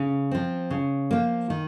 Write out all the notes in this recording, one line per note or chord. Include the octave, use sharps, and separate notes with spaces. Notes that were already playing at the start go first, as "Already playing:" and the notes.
Already playing: C#3
F3 C4
C#3
F3 A#3
D#3